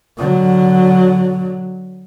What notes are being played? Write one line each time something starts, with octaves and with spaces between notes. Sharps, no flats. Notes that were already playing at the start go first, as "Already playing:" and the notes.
D3 F#3